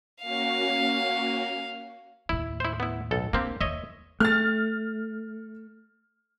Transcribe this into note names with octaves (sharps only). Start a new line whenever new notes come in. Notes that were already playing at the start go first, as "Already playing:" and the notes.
A#3 C#4 F#4 F5
D#2 A2 E4
E4 C5
B3 E4
B1 A4
A#3 C4 D4 G4
D#2 D#3 C#5 D#5 E5
A3 F6 A6